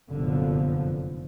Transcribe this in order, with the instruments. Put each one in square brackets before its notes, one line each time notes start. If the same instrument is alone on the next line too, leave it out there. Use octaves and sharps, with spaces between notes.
[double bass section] F1 F#2 A#2 D3 F3 B3